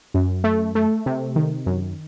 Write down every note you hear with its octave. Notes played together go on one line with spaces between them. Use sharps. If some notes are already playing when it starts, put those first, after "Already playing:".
F#2
A3
A3
C3
D#3
F#2